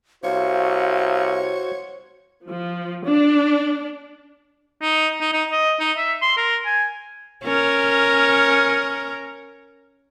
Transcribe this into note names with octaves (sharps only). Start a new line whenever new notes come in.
C2 F#4 C5 C#5 F5
F3
D4
D#4
D#4
D#4
D#5
D#4
E5
C6
A#4
G#5
C#4 A#4